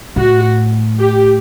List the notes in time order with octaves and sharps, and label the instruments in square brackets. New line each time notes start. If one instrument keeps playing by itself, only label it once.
[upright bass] A2 [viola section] F#4
[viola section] G4